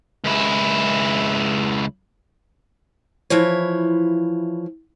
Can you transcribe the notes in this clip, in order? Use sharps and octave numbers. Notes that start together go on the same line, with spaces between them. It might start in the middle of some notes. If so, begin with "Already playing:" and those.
C#2 E4
E3 F3 E4 C#5